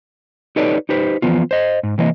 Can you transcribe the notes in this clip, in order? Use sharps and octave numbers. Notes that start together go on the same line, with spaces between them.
D#4 G4 A4 B4 C#5 D5
D#4 G4 B4 C5
E3 F3 B3 F4
C5 D#5
G#2
C3 E3 A#3 D#5